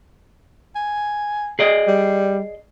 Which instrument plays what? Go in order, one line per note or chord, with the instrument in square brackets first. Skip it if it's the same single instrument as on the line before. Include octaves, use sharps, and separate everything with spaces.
[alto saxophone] G#5
[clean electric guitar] G#4 D5 D#5
[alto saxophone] G3